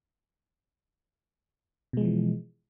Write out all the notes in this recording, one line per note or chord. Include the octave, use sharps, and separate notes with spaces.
B2 E3 F3 G#3